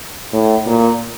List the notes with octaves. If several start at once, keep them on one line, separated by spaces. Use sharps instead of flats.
A2
A#2